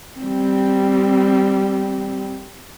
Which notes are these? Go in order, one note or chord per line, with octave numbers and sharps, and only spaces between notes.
G3 C4